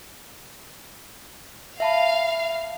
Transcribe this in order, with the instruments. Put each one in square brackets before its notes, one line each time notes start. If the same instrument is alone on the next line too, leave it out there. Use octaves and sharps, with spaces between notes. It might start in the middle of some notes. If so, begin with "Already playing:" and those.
[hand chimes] E5 A5 B5 [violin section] F5